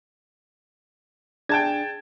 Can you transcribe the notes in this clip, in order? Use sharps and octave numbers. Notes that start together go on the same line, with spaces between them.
D4 G#4 G5 A5 G#6